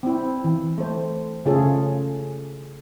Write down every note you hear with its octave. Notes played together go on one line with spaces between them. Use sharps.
C4 E4
E3
A3 C5
C#3 A3 C#4 F4 G#4 A4